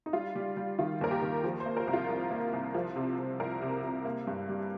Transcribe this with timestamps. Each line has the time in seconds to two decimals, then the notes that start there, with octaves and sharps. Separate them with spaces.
0.06 D#4
0.13 G3 F4
0.35 G3
0.57 G3
0.78 D#3 F4
1.01 D#2 A#4
1.11 G4
1.22 D#2
1.44 F3
1.60 C5
1.66 A#3
1.77 A#4
1.87 C2
1.93 F4
2.10 C2
2.31 A#3
2.53 C2
2.74 F3
2.96 C3
3.18 C3
3.40 C2 A#4
3.62 C3
3.84 C3
4.05 A#3
4.27 G2
4.49 G3